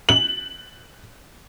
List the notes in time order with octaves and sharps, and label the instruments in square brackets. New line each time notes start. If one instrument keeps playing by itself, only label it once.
[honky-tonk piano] F#7